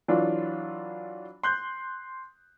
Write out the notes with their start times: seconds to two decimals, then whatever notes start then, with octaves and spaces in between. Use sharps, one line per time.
0.08 E3 F#3 D4 F4
1.43 C6 F#6 G6